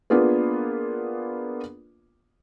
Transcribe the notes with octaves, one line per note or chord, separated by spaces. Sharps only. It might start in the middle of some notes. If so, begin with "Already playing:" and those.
A#3 B3 D4 F4 G#4 B4